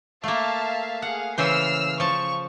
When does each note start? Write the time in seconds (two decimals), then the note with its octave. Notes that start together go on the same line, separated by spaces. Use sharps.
0.24 A3 A#3 E5 F5 A5
1.02 G#4 F5 F#5
1.38 C#3 E3 C5 E6 F6 C7
2.00 F3 A5 C#6